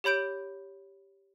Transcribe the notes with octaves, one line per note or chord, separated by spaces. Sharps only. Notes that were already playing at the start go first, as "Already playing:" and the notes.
G4 C#5 B5 G6 D7